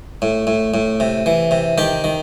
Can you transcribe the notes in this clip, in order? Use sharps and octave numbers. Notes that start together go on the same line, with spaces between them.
A2
A2
A2
C3
E3
C3
D#3 G4
D#3